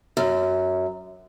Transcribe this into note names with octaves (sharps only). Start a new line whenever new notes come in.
F#2